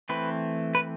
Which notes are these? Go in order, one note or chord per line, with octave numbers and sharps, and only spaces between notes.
E3 A3 C4 B4
B4